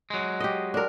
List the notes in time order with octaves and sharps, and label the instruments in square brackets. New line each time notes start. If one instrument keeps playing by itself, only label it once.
[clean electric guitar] F#3 G#3
[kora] G4 D#5
D4 A#4